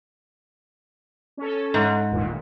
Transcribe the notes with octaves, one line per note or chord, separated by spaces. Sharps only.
C#4 A4
G#2
G1 D#2 A#2